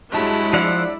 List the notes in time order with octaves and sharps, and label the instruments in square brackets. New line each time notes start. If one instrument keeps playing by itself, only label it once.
[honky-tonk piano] G2 A5 [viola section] F#3 G#3 [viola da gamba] E4
[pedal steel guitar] F3 F#5 [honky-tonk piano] D4 E6 F7